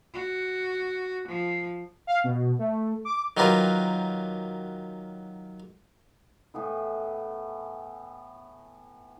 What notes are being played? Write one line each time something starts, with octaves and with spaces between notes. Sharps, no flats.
F#4
F3
F5
B2
A3
D6
D#3 F#3 F4 G4 A#4 B4
A2 E3 B3 E4